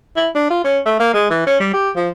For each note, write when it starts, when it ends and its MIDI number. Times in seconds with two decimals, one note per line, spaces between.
0.16 0.29 64
0.35 0.50 62
0.50 0.62 65
0.64 0.79 61
0.86 0.97 57
0.99 1.13 58
1.14 1.28 56
1.30 1.42 52
1.46 1.57 61
1.60 1.71 55
1.73 1.90 67
1.96 2.09 53